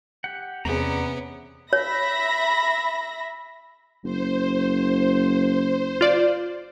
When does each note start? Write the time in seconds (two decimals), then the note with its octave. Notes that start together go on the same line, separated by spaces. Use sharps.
0.24 G4 F#5
0.65 E2 C3 B3 C#4 G#4 D5 A#5
1.73 C#5 E5 B5 A#6
4.04 F#1 C5
6.01 F4 D5